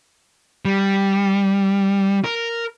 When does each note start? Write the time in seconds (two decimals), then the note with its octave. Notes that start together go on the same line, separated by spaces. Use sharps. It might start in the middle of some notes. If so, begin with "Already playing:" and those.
0.65 G3
2.24 A#4